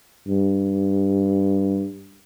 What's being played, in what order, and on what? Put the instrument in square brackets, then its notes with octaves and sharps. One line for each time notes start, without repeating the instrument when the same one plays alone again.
[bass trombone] G2